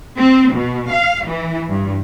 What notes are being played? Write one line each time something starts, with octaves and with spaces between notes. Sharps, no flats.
C4
B2
F5
E3
G2